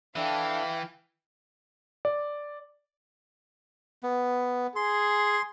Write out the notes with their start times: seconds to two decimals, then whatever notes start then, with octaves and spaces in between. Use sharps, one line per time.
0.16 E3 D4 A4 E5 F5 G5
2.05 D5
4.03 B3
4.76 G#4 C6